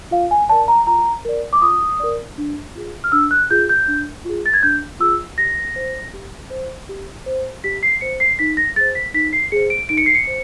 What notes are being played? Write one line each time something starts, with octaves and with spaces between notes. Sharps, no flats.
F4 F5
G#5
A#4 D5 A5
A#5
F4 A#5
A#4 D5
D6
F4 D#6
A#4 D5
D4
F4 G#4
F6
D4 E6
F#6
F4 G#4 G6
G6
D4
F4 G#4
A6
G#6
D4 G6
F4 G#4 E6
G4 A#6
C5
G4
C5
G4
C5
G4 B6
C7
C5 C#7
C7
D#4 B6
A#6
G#4 C5 A6
B6
D#4 B6
C7
G#4 C5 C#7
D7
D#4 D7
C#7
C7
C#7
C5